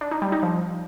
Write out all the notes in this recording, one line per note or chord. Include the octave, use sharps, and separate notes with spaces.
D4
D#4
G3
D#4
F3